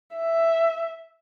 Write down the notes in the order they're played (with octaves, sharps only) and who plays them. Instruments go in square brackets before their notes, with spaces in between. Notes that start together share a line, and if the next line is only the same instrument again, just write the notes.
[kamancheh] E5